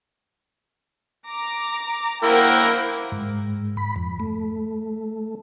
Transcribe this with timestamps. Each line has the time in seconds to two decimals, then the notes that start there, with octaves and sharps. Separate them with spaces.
1.26 A#5 D6
2.23 A#3 E4 A#4 C5 F#5 G5
3.12 G#2
3.77 B5
3.96 F2
4.20 A3